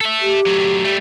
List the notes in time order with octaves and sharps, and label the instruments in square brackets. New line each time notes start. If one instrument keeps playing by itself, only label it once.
[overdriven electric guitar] A4 E5
[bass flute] G4
[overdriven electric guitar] F#3 A3
G3 A3